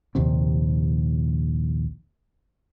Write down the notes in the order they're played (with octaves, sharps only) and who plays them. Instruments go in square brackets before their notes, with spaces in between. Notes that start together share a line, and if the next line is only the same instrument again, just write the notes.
[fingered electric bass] A#1 D#2 C3 C4